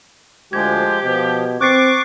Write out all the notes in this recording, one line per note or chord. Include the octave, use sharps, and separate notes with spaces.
D2 F3 G#3 G4 G#6
B2 F3
C4 C#6 D6 F#6 A6 C7